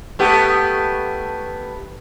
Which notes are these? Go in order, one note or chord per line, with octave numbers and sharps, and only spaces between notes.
A3 B3 G4